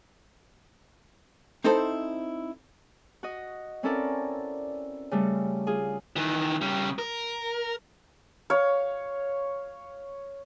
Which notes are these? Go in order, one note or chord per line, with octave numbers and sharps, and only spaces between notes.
C4 D#4 E4 A4 C5
F#4 D#5
C4 C#4 E4 A4 A#4 D5
C#3 G3 A3
F4 G#4
D#3 E3
C#3 G3
A#4
C#5 F5